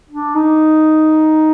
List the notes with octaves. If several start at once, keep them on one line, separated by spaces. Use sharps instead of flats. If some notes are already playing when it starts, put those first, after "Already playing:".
D4
D#4